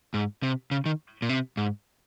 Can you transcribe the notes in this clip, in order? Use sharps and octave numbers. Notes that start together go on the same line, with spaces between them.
G#2
C3
C#3
D#3
A#2
C3
G#2